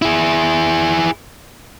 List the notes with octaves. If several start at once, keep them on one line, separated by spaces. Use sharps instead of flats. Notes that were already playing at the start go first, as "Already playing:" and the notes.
E4 G#4